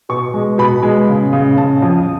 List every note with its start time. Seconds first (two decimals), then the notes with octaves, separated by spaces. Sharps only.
0.09 B2 C#6
0.34 G#3
0.58 B2 B5
0.83 G#3
1.08 C#3
1.33 C#3
1.57 C#3 A5
1.82 F2